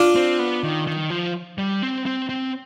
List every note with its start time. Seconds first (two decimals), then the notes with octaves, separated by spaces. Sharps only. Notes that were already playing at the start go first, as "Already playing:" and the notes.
Already playing: D4 F4
0.15 C4
0.39 B3
0.63 D#3
0.87 D#3
1.10 F3
1.58 G3
1.82 C4
2.06 C4
2.29 C4